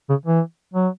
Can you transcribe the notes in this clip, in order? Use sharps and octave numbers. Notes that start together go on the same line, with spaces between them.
C#3
E3
F#3